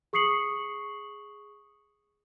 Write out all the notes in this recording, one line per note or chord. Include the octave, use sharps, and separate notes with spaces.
G#4 C#6 D#6 C7 C#7 F#7